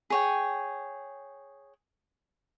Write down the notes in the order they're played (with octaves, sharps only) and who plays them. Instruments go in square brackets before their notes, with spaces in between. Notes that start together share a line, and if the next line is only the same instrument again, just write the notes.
[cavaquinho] G#4 C#5 G5